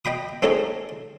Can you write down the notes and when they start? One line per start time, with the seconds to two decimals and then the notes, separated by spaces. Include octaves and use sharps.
0.05 D#5 G5 B5 D#6
0.42 C4 C#4 D#4 G#4 A4 D#5